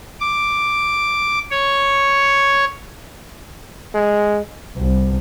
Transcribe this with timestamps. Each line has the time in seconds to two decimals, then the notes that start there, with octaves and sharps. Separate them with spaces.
0.20 D6
1.51 C#5
3.94 G#3
4.77 C2